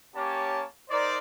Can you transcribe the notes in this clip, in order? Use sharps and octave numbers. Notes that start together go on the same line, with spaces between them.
A#3 C#4 G4 C#5 A5
D#4 A#4 C5 D5